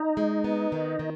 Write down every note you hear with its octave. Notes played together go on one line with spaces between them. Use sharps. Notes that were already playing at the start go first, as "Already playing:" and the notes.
Already playing: D#4
G#3
B3
D#3
D#3